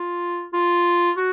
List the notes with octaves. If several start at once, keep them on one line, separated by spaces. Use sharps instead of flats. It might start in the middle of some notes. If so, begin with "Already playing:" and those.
Already playing: F4
F4
F#4